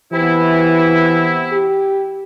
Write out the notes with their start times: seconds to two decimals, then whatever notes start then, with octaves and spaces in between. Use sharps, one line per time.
0.13 C3 E3 B3 E4
1.52 G4